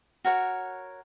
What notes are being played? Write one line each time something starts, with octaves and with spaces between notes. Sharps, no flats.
F#4 A#4 C#5 F#5